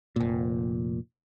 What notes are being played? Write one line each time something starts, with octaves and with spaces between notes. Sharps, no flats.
F1 A#2